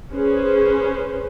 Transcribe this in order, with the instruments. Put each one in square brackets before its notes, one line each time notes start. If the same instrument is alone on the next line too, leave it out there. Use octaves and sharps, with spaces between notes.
[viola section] C#4 G#4 B4 C5